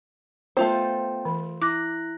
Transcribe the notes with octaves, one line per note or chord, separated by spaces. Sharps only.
A3 B3 F4 C5 G5
E3
E4 D6 F#6 A#6